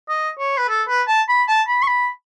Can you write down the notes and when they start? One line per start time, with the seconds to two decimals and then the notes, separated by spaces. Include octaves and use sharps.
0.09 D#5
0.39 C#5
0.57 B4
0.69 A4
0.88 B4
1.08 A5
1.29 B5
1.48 A5
1.68 B5
1.82 C#6
1.87 B5